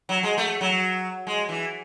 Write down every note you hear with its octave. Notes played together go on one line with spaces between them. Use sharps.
F#3
G#3
A3
F#3
G#3
E3